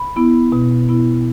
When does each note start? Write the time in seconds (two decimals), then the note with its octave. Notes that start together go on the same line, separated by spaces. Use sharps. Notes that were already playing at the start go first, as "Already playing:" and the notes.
Already playing: B5
0.16 B3 E4
0.52 B2
0.89 B3 E4